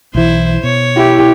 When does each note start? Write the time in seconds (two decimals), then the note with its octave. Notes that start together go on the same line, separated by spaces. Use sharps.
0.15 B1 E3 E4 C5
0.63 B2 C#5
0.97 E4 G4